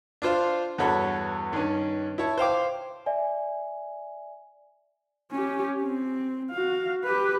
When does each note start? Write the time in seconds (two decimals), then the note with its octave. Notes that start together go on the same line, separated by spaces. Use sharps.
0.22 D4 F4 C5 F5
0.78 E2 G2 F#4 A4 C#5 B5
1.53 G2 D#3 C#4
2.18 E4 C#5 A5
2.38 C5 F5 G5 D6
3.06 D5 E5 G#5
5.31 C#4 G4
5.82 C4
6.51 F#4 F5
7.04 G4 B4